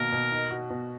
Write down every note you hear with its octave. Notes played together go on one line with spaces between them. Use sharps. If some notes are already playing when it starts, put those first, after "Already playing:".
Already playing: B2 D#3 A#3 A#4
B2
D#4
F#4
B2